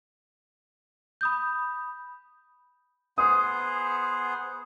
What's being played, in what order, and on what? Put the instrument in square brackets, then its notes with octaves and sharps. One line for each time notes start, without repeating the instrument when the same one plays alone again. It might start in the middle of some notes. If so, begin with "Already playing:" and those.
[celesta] B5 D#6 G6
[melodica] B3 G#4 C5 [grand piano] D#6